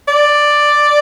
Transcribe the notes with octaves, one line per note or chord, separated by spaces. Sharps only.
D5